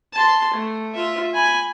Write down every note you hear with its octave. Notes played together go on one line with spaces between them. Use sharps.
A5 C6
A3
F4 E5
G#5 B5